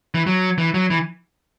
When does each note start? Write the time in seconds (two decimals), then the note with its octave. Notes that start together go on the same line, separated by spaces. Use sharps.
0.15 E3
0.26 F#3
0.58 E3
0.74 F#3
0.90 E3